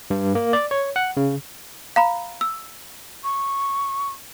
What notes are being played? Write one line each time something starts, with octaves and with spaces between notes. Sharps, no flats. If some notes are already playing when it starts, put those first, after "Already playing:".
G2
A#3
D5
C#5
F#5
C#3
F5 A#5 B5
E6
C#6